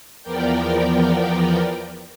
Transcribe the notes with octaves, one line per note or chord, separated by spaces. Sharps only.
E2 F3 B3 A#4 D5 G5